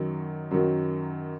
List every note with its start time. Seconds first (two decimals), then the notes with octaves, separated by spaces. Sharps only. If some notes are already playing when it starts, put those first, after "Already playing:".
Already playing: F#2 D#3 F#3
0.51 F#2 D#3 F#3